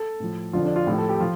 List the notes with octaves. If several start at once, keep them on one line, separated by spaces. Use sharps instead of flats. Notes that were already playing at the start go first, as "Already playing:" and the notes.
Already playing: A4
A2 F3
F2 D3 F3 F4
D4
F4
A2 F3 G4
A4
G4
F3 F4